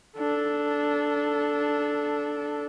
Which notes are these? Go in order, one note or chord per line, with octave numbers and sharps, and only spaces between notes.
D4 A4